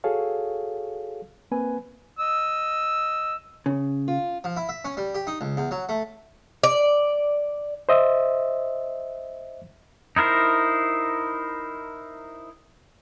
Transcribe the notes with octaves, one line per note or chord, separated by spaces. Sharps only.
F#4 G#4 A4 C#5 F5
A#3 C4 B4 G#5
D#5 E6
C#3
F4
F3
E4
E5
C#4
G3
G4
D#4
C#2
E2
F#3
A3
D5
C5 D#5 E5
D#4 E4 A#4 C5